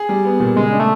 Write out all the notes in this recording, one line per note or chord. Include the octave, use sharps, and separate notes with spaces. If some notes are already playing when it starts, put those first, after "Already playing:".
Already playing: G#4
G3
B3
A#2
C#3 G#3
D4
A3